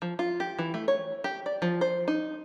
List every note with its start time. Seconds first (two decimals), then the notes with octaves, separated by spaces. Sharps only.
0.02 F3
0.19 F4
0.40 G4
0.59 E3
0.74 A3
0.88 C#5
1.24 G4
1.46 D5
1.62 F3
1.81 C5
2.08 D#4